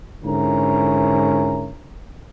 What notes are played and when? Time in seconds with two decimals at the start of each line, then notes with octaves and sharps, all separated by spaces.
0.24 G#2 D3 C#4 E4 A#4 A#5